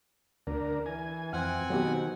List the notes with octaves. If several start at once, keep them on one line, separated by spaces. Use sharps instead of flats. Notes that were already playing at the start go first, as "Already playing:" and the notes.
D2 D4 A#4
E3 G#5
F2 C4 F#5 G#5 F6
B2 D#3 F#3 B3 G4